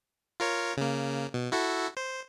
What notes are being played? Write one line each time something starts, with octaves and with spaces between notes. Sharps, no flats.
F4 A#4 C#5
C#3 A#3
B2
E4 F#4 A4
C5